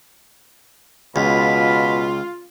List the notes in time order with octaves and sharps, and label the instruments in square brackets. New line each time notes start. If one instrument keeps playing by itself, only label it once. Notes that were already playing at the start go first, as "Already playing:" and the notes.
[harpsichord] C#2 [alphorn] B2 [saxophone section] F4 [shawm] B5